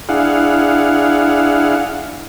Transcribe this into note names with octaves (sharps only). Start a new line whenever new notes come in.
D4 E4 G#4 F5 F#5